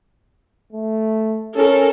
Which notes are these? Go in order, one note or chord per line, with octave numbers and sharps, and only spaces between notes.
A3
C#4 A4 A#4